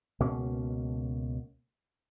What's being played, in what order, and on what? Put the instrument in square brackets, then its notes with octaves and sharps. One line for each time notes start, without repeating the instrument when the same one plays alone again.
[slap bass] C#2 B2 A#3 C#4